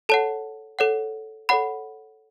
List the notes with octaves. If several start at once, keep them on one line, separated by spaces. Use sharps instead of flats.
A4 C#5 F#5 A5
A4 C#5 F#5
A4 C#5 F#5 B5